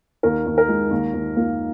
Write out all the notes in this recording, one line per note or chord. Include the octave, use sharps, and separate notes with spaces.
D#2 A#4
D#2
A#4
G#3
D#2
D#2
A#3